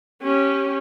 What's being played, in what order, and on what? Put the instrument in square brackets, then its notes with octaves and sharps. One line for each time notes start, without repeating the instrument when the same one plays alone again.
[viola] C#4 G4